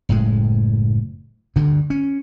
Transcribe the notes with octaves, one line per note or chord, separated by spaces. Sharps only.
F#1 A2 G#3
D2 G2 D3
C#4